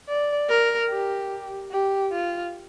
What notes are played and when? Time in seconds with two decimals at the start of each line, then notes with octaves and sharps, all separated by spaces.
0.08 D5
0.49 A#4
0.90 G4
1.71 G4
2.12 F4